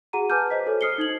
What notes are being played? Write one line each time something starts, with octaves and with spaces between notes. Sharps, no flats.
F#4 G#4 F#5 A#5 D#7
B4 G#5 A5 D6 F6 G6
C5 D#5 B6
F#4 A4 C#5
C5 D#6 F6 C7 C#7 G7
D#4 G#6 F#7